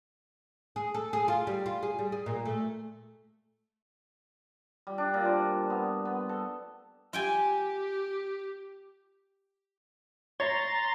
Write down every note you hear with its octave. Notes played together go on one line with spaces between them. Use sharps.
G#4
A4
G#4
F4
G3
F4
G#4
G3
G#4
A#2
A3
G3
D4
A#2
C5
B3
B3
A4
F4 G4 G5 G#5
C#5 A#5 C6 A6